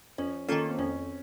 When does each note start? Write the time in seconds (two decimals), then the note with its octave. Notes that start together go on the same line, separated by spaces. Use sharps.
0.18 F2 C#4
0.49 D#3 A#3 C#4 F4 A4
0.69 C4
0.79 F2 C#4